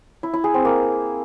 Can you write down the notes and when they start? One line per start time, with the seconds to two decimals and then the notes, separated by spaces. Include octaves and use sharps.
0.23 E4
0.34 E4
0.44 G#4
0.54 C4
0.65 A#3